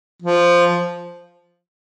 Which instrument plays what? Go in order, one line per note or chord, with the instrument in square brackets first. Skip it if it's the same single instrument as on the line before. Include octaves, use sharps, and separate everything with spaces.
[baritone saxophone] F3